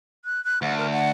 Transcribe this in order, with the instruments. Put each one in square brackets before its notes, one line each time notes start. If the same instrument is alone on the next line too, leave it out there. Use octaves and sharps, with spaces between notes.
[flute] F#6
F#6
[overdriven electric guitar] D2 [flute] F#5
[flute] A#4
F#5